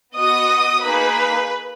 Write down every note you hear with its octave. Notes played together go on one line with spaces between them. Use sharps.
B3 F#4 D#5 D#6
A#3 D#4 G#4 B4 B5